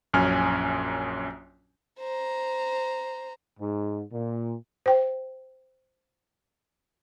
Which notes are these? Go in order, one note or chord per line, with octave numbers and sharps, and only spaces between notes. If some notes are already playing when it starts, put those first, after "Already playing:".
A#1 F#2 C#4 G#5 F6
C5 A#5
G#2
A#2
C5 G5